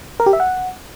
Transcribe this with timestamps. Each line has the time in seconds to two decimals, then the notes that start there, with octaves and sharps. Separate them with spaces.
0.20 A#4
0.26 G4
0.33 E5
0.40 F#5